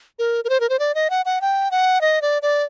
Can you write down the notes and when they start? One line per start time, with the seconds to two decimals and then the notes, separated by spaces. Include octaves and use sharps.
0.19 A#4
0.45 A#4
0.50 C5
0.60 A#4
0.69 C5
0.79 D5
0.95 D#5
1.10 F#5
1.26 F#5
1.41 G5
1.71 F#5
2.01 D#5
2.22 D5
2.42 D5